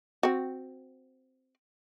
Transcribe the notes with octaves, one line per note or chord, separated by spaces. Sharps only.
C4 F#4